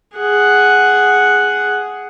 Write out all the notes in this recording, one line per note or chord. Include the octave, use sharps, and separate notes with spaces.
G#4 F#5